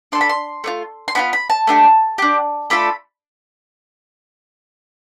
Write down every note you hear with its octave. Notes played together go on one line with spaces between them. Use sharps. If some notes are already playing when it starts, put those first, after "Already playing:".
D4 A4 C6
B5
C6
A3 D4 F4
C6
B3 D4 F4 B5
B5
A5
A3 D4 G4
D4 G4
A3 D4 F4 A4 B5